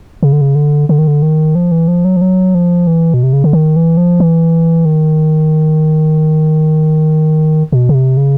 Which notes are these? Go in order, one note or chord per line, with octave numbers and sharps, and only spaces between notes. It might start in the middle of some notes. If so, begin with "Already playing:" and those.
C#3
D3
C#3
D3
D3
D#3
D3
D#3
F3
E3
F3
F#3
F3
F#3
F3
E3
B2
C3
C#3
D3
D#3
E3
F3
E3
D#3
B2
C#3
C3
C#3